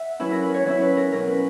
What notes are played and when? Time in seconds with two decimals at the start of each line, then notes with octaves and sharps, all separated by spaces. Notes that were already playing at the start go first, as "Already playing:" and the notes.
Already playing: E5 F#5
0.20 F#3 C#4 E4 B4
0.32 A#4
0.43 B4
0.54 C#5
0.66 F#3 C#4 E4 C#5
0.82 B4
0.97 A#4
1.12 B2 F#3 C#4 A#4
1.28 B4